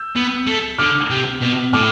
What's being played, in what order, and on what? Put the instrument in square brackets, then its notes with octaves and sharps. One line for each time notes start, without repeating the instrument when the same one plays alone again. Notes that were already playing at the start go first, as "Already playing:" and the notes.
Already playing: [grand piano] E6 G6
[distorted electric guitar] B3
A3
[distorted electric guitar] D3 [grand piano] D6 F6
[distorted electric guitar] C3
B2
[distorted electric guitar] A2 [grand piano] D6 F6